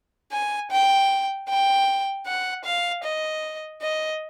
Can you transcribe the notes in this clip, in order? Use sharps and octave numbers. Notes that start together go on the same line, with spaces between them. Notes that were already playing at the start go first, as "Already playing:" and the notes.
G#5
G5
G5
F#5
F5
D#5
D#5